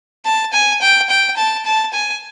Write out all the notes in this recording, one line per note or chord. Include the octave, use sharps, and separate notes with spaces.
A5
G#5
G5
G5
A5
A5
G#5